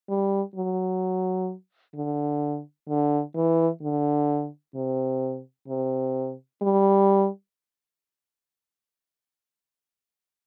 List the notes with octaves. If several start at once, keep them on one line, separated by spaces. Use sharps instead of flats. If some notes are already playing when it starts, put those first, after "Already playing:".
G3
F#3
D3
D3
E3
D3
C3
C3
G3